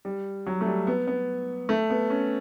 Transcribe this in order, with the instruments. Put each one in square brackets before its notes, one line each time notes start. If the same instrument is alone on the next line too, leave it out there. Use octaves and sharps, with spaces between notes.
[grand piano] G3
F#3
A3
G3
B3
B3
A3
B3
C#4